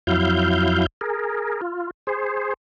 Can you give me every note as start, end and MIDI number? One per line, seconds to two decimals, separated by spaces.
0.07 0.86 41
0.07 0.86 54
0.07 0.86 64
0.07 0.86 77
0.07 0.86 91
1.01 1.61 68
1.01 1.61 70
1.62 1.91 65
2.07 2.54 68
2.07 2.54 72